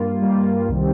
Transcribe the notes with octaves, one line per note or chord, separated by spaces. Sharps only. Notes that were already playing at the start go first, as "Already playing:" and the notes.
Already playing: G2 G3 A#3 F4
G2 G3 A#3 F4
C2 C3 D#3 G3 C4